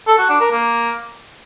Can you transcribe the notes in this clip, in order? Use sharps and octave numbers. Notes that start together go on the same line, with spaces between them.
A4
F#4
D4
A#4
A#3